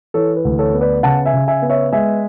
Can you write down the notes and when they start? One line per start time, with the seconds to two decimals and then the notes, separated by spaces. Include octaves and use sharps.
0.14 E3 A4 C#5
0.36 B4
0.45 D2
0.59 A4 C#5
0.74 B3
0.81 B4 D5
1.03 C#3 F#5 A5
1.26 E5 G#5
1.34 C#3
1.48 E5 G#5
1.62 B3
1.70 C#5 E5
1.92 G#3 E5 G#5